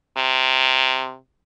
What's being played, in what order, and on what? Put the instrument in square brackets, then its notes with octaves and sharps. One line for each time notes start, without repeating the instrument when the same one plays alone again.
[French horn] C3